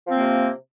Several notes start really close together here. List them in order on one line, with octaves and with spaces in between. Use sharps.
F3 C4 A#3 C3